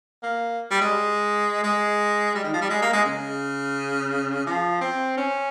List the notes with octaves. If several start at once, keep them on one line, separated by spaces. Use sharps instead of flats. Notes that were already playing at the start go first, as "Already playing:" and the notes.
A#3
G3
G#3
G#3
G3
D#3
F3
G3
G#3
A#3
G#3
C#3
F3
C4
C#4